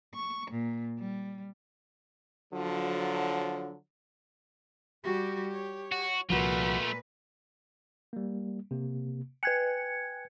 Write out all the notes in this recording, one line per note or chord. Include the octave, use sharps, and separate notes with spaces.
C#6
A#2
G3
D3 F3 F#3
G3 F#4 G4
C#5
F#4
C2 A#2 F3 A3 F4 F#4 B4
G3 A#3
C3 A#3
B4 G5 G#5 F#6 G#6 C#7